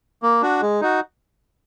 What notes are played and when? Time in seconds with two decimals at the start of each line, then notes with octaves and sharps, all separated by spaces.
0.23 A#3
0.42 D4 F#4
0.61 G#3
0.81 D#4 F#4